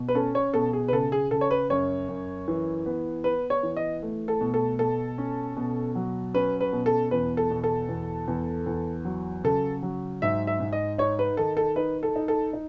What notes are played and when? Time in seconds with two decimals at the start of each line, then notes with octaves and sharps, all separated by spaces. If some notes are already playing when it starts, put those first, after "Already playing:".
Already playing: B2
0.08 B4
0.15 C#4 A4
0.35 C#5
0.54 B2 A4
0.73 G#4
0.88 B4
0.92 C#3 A4
1.12 G#4
1.31 C#3 A4
1.41 C#5
1.51 B4
1.70 F#2 C#5
2.08 F#2
2.48 E3
2.86 B3
3.24 B3 B4
3.50 C#5
3.63 E3
3.77 D#5
4.02 A3
4.28 A4
4.41 B2
4.54 A4
4.79 B2 A4
5.18 C#4
5.57 B2
5.95 F#3
6.34 C#4 B4
6.61 B4
6.73 B2
6.86 A4
7.11 E2 B4
7.37 A4
7.51 B2
7.64 A4
7.89 E2
8.28 E2
8.66 E2
9.05 F#3
9.44 C#3 A4
9.83 F#3
10.22 G#2 E5
10.47 E5
10.60 G#2
10.73 D#5
10.98 D#4 C#5
11.19 B4
11.37 D#3 A4
11.57 A4
11.76 D#4 B4
12.03 A4
12.16 D#4
12.28 A4
12.53 D#4